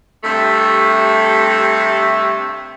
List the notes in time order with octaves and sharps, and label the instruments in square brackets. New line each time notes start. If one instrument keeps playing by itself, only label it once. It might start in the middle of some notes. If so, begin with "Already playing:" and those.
[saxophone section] G2 C3 A3